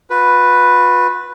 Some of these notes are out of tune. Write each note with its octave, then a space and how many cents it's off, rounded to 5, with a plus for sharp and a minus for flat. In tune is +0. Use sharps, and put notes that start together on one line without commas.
F4 +45 B4 +0